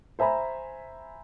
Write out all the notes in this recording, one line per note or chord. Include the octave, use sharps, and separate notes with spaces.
C5 E5 G#5 A#5 B5